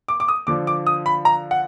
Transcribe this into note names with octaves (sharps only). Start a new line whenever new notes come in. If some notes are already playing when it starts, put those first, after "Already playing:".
D6
D6
D#6
D3 F3 D6
D6
D#6
B5
A#5
F#5